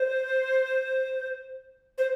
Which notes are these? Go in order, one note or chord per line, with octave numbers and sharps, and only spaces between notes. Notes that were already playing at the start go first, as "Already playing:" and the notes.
Already playing: C5
C5